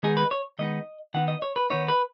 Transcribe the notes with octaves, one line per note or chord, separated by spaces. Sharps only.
D#3 G#3 B3 D#4 G#4
B4
C#5
D#3 G#3 B3 D#4 D#5
D#3 B3 D#4 F#5
D#5
C#5
B4
D#3 B3 D#4 C#5
B4